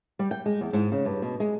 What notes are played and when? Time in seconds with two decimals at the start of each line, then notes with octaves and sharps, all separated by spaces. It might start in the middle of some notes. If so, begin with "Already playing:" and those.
0.19 G3
0.31 G5
0.46 G#3
0.61 E2
0.73 G#2
0.92 C#3
1.05 G2
1.22 B2
1.40 G#3